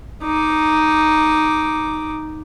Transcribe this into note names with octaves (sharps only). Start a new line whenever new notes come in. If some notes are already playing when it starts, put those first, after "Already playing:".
D#4 D6